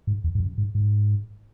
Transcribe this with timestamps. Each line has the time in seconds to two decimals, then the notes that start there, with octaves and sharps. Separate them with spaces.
0.07 G#2
0.24 E2
0.35 G#2
0.40 F#2
0.58 G#2
0.75 G#2